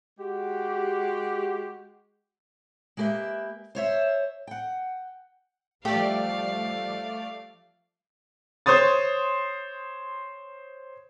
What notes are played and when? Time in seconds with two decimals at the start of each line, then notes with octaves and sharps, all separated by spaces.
0.18 G#3 F#4 G4
2.97 G#3 A#3 G4 B4 E5
3.75 C5 C#5 E5
4.47 F#5 G5
5.85 F3 G3 A3 G4 D5 F5
8.66 C5 C#5 C6 D#6 A6